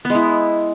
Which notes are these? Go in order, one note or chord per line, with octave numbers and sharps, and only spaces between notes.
B3
G#3
E4